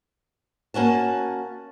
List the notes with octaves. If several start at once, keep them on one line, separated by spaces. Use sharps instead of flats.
A#3 C#4 F#4 A5